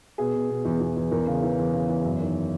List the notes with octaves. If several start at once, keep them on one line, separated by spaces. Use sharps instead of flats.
B2 G#4
B2
B2
E2
E2
E2
E2 A#4
C#3
E3
E2
C#3
E2
F#2
D#3